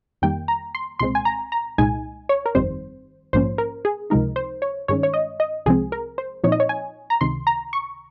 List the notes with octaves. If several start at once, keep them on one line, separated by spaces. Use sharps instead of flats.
F2 D#3 G3 A#3 G5
A#5
C6
C2 A#2 G#3 C4 C6
G#5
A#5
A#5
C2 A#2 G#3 D#4 G#5
C#5
A#4
G1 F2 D#3 G3 C4 C5
A#1 G#2 F3 A#3 C#4 C5
A#4
G#4
C#2 C3 F3 G#3 D#4 A#4
C5
C#5
G2 D#3 G#3 C#4 C#5
C#5
D#5
D#5
C2 C3 F3 G#3 C4 G#4
A#4
C5
A#2 F3 C4 D#4 C#5
D#5
C#5
G#5
A#5
C#2 C3 D#3 C6
A#5
C#6